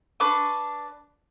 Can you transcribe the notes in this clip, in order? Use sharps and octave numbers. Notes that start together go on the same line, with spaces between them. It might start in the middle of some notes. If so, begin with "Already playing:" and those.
D4 B4 C#6 D6